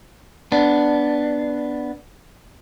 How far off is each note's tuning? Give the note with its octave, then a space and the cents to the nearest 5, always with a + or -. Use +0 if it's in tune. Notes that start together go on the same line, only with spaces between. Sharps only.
B3 +0 D4 +0